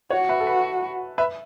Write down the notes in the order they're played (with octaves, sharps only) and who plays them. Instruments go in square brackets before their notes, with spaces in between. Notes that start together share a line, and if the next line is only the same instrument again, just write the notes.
[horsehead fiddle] F#4 [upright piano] C#5 F#5
[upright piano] B4 E5
A4
B4
B4 E5